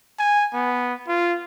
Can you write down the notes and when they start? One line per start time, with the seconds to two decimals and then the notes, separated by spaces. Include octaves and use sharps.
0.19 G#5
0.54 B3
1.08 F4